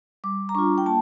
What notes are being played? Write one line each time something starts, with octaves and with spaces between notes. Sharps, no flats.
G3 D6
A#5
D4 F4 C#6
G5
A#3 A5